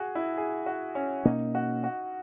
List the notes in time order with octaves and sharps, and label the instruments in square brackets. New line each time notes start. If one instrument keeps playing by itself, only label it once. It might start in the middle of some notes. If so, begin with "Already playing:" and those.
Already playing: [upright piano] F#4 G#4
E4
G#4
F#4
C#4
[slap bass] B2 A#3 C#4 [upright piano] D#4
[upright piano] F#4
F#4